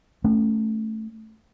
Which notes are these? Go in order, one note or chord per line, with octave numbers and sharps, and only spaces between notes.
A3 C#4